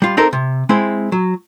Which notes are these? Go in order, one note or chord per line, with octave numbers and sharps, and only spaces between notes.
G3 F4
C4 D#4 G4 A4 A#4 C5
C3
G#3 C4 E4
F#3